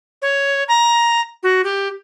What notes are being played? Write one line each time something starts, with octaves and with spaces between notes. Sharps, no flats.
C#5
A#5
F#4
G4